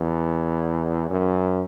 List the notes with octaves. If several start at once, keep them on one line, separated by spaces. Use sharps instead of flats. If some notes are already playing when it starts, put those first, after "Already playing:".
Already playing: E2
F#2